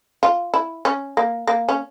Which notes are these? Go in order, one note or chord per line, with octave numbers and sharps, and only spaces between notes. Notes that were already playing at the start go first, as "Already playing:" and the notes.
F4
E4
C#4
A#3
A#3
C#4